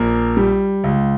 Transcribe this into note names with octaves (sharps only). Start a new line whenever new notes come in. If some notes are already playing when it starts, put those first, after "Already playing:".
Already playing: A#1 A#3
G3
C#2